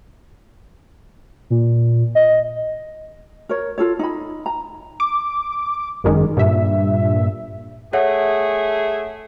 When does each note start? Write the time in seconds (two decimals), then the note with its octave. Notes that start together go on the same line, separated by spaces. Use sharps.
1.50 A#2
2.15 D#5
3.49 A#4 C#5
3.78 F4 A4 C#5
3.99 D#4 B5
4.46 A#5
5.00 D6
6.04 G#1 F#2 D#3 G#3
6.37 G2 A#2 E5
7.93 A3 G#4 C#5 E5 F#5